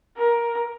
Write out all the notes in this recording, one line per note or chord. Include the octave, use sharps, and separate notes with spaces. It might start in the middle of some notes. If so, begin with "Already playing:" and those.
A#4